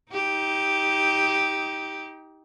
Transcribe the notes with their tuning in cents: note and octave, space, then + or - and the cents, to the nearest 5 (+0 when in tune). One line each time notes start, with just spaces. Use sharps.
D#4 +25 G4 -5